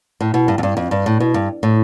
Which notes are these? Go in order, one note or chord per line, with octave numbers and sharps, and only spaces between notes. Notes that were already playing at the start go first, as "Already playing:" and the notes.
A2
B2
G2
F2
G2
F2
G2
A2
B2
G2
A2